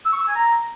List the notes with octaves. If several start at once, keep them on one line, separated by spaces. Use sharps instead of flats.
E6
C#6
E6
G#5
A#5